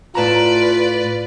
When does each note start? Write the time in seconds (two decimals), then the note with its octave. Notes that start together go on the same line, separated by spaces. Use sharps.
0.15 A2 F4 B4 D5 A5 A#5